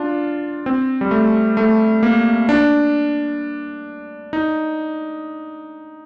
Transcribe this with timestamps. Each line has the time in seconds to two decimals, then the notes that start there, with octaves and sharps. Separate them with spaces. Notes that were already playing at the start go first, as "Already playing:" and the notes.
Already playing: D4 F4
0.66 C4
1.01 G3
1.11 A3
1.57 A3
2.03 A#3
2.49 D4
4.33 D#4